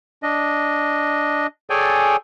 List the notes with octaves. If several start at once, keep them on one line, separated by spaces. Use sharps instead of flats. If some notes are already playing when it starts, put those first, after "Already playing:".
D4 D#5
G#4 A4 C#5 D5 G5 G#5